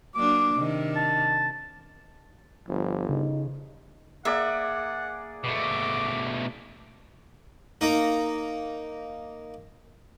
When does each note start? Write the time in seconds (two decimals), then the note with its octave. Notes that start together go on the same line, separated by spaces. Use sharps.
0.15 F#3 A#3 D4 D6
0.55 C3 D#3
0.96 A5
2.68 G1 F3
3.09 C#3 D#4
4.25 A#3 G#4 D5 E5 F#5
5.44 B2 A3 D6
7.81 A#3 D#4 A#4